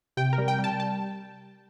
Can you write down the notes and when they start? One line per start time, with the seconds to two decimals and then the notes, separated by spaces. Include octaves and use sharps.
0.17 C3 G5
0.33 A#4
0.38 G3
0.48 G5
0.59 G3
0.64 A5
0.80 A5